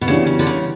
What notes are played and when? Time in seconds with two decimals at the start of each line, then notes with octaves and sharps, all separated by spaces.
0.01 B2
0.08 C#3 E3 G3 D4 F#4
0.27 C#3
0.39 D3
0.47 C#3